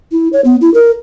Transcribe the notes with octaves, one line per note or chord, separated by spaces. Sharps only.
E4
C#5
B3
E4
A#4